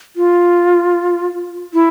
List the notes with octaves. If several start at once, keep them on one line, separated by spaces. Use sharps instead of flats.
F4
E4